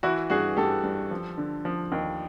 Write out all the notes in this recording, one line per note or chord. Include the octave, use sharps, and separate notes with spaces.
E3 E4 F#4
G2 F#4 G#4
G2 G4 A4
G2
F3
D3
F3
D#2